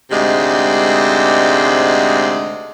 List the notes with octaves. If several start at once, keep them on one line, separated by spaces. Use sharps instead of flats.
D2 G#2 C3 G#3 D5